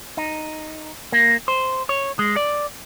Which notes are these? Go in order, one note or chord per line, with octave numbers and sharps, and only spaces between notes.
D#4
A#3
C5
C#5
G#3
D5